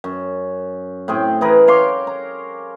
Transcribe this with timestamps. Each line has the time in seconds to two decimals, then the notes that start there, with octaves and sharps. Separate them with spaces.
0.04 F#2
1.08 A2 C4 G#4 G5
1.41 E3 G#4 A#4 B4
1.68 C#5 F5 C6 D6
2.07 A#5